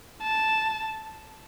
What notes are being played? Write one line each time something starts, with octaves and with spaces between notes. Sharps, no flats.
A5